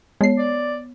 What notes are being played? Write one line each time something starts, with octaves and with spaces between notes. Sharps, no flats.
G#3 B3 C#5 C7
D5